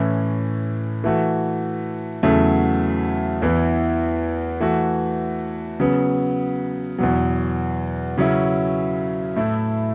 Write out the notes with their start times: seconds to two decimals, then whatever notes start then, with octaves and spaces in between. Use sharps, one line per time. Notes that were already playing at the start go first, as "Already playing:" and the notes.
Already playing: A2 E3 C#4
1.04 E3 A3 F#4
2.23 E2 C#3 F#3 A3
3.42 E2 E3 B3 E4
4.61 E3 A3 F#4
5.80 C#3 F#3 B3
6.98 E2 B2 F#3
8.17 C#3 F#3 C#4 E4
9.36 A2 A3 E4